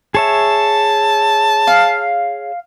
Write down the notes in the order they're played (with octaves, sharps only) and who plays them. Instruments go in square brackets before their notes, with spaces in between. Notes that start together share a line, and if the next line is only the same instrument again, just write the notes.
[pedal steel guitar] G#4 C#5 E5 [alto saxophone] A5
[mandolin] F5